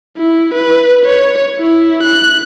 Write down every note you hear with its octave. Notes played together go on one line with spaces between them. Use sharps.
E4
B4
C#5
E4
F#6